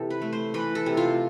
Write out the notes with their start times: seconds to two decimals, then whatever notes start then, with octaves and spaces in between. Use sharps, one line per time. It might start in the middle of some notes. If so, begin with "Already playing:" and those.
Already playing: C3 E3 G4 A4
0.10 B4
0.22 A3
0.33 C5
0.54 E3 B4
0.75 A4
0.86 C3
0.97 F4